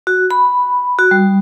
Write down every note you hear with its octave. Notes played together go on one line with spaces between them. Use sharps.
F#4
B5
F#4
G3